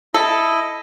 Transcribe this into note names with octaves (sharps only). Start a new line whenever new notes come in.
E4 A4 D#5